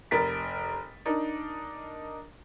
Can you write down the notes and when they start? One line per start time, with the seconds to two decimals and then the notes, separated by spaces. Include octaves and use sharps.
0.11 F1 A#4 A6 B6
1.05 D4 D#4 A#4